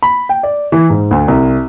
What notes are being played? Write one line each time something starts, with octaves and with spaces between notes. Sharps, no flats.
B5
G5
D5
E3
G#2
D2
C2